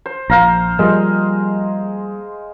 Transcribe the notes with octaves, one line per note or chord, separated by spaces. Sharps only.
C5
A#1 C5 F5 A#5
F3 G3 G#3 A#3